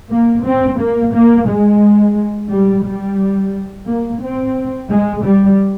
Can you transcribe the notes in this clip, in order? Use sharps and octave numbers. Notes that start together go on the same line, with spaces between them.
A#3
C4
A#3
A#3
G#3
G3
G3
A#3
C4
G#3
G3